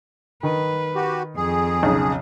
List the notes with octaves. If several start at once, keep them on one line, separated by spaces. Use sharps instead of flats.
D#3 B4
F#4 G4
F2 G#4
B1 C#3